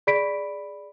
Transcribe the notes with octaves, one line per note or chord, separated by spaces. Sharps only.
G#4 D5 B5 B6 D7